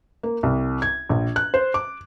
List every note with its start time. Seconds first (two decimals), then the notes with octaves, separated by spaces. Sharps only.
0.23 A#3
0.43 C2
0.82 G#6
1.09 A#1
1.36 F#6
1.54 C5
1.74 D6